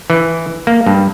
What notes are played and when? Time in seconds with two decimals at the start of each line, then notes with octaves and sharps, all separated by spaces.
0.10 E3
0.67 A#3
0.86 G2